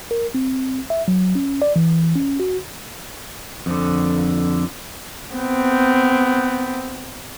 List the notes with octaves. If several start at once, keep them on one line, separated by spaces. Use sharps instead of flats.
A#4
C4
E5
F#3
C#4
D5
E3
C#4
F#4
F2 D3
B3 C4